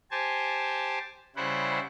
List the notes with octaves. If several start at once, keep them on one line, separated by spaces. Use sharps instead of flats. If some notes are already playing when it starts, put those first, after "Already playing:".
G4 C5 G#5 A5
C#3 G3 E4 C5 F#5